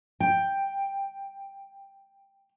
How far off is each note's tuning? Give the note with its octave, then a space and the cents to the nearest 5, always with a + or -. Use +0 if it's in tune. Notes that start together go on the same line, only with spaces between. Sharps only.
G5 +5